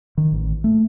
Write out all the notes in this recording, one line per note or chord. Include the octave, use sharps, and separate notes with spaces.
D#3
A1
A3